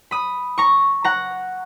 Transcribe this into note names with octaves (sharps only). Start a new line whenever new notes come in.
B5 D#6
A#5 C#6
F#5 A#5